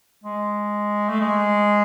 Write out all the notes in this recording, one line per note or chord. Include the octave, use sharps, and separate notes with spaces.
G#3
A3
G#3